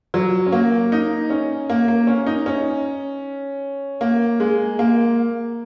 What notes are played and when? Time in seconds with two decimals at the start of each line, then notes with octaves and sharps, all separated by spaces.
0.14 F#3
0.46 C#4
0.52 A#3
0.92 D#4
1.30 C#4
1.70 A#3
1.88 A#3
2.07 C#4
2.26 D#4
2.46 C#4
4.01 A#3
4.40 G#3
4.79 A#3